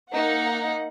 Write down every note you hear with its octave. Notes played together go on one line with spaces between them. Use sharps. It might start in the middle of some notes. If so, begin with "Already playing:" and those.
A#3 D#4 F#5